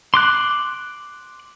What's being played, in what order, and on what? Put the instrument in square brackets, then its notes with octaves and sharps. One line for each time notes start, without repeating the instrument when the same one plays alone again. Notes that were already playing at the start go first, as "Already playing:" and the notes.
[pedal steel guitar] C6 D6 F#6